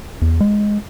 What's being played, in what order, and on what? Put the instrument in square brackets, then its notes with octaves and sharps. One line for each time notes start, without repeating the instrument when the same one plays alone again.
[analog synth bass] E2
G#3